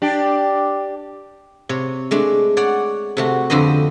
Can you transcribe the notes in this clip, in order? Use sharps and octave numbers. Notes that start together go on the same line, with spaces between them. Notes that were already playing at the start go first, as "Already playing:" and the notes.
D4 G4
C3 C#5
G#3 A3 D4
C#5 D5 F#5
C3 A3 F#4
F2 D3 B4 C5 D#5